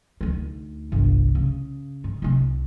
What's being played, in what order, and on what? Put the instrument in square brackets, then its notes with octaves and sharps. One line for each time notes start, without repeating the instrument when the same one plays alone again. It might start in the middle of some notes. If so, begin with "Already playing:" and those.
[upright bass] D2 D#4
G1 C2
C#3
G#2
C2 C3